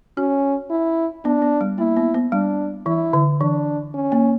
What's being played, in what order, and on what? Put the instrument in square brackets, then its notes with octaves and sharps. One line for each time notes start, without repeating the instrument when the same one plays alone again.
[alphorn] C#4 [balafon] F#4
[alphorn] E4
[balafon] B3 [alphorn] D4
[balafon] B3
G3
[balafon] A#3 [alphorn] E4
[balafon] B3
B3
[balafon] G3 [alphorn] D4
[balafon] E3 [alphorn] E4
[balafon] D3
[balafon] E3 [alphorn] D4
[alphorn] C#4
[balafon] A#3